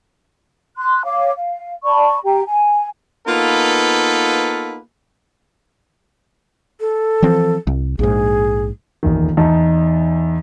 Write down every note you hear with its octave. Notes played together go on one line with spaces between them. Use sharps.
C6 F#6
C#5 F5 D6
F5
D5 A5 B5 C#6
G4 G5 A#5
G#5
A#3 B3 D#4 F4 A4 B4
A4
E3 F3 C4
C2
A#1 G#2 G#4
D#1 E2 D#3
E2 D#4 A5